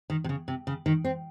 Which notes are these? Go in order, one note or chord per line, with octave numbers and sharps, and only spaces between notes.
D#3
C3
C#3
C3
C#3
D#3
C4